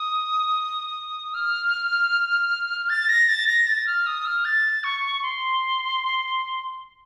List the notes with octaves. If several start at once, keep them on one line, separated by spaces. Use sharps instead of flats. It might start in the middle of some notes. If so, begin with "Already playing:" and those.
Already playing: D#6
F6
A6
A#6
A6
A#6
A6
F6
D#6
F6
A6
C#6
C6